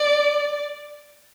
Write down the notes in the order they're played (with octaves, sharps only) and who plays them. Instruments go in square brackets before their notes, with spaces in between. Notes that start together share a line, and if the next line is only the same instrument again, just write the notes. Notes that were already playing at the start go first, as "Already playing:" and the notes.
Already playing: [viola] D5